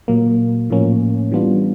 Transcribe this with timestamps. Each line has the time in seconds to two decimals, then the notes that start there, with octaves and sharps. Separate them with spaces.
0.08 A#2 F#3 A#3
0.70 A2 F3 A#3 C#4
1.31 E3 G3 B3 D4 F4